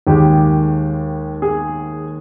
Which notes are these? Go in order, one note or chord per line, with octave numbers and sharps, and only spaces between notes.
D#2 D#3 G#3 G4
G#4